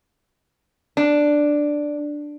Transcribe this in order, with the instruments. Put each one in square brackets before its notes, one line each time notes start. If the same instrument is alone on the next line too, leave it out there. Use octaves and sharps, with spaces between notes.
[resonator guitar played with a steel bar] D4